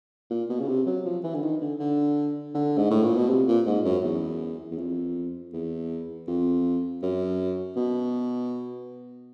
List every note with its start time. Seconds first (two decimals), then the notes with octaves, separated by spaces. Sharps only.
0.31 A#2
0.50 B2
0.60 C#3
0.68 C3
0.86 F#3
1.05 F3
1.24 E3
1.35 D3
1.43 D#3
1.61 D3
1.80 D3
2.55 D3
2.78 G#2
2.91 A2
3.03 A#2
3.17 B2
3.30 C3
3.48 A#2
3.66 G#2
3.85 F#2
4.04 E2
4.71 E2
4.78 F2
5.53 E2
6.27 F2
7.03 F#2
7.76 B2